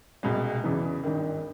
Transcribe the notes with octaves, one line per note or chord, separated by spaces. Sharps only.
C2 B2 G#3
E2 C#3 E3
G#1 G2 D#3